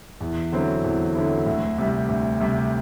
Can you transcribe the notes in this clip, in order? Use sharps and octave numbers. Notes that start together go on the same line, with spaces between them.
E2
D3 F#3 C4 E4
E2
D3 F#3 C4 E4
D2
C3 G3
D2
C3 G3